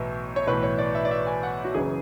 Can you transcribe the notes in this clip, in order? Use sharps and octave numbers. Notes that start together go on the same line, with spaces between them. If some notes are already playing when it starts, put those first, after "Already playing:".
Already playing: B1 A2 E3
C#5
B1 A2 E3 B4
C#5
D5
E5
D5
E5
G#5
F#5
F#4
F#1 F#2 C#3 E3 G#4